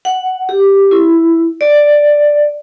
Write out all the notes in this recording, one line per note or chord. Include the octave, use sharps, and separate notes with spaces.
F#5
G4
E4
D5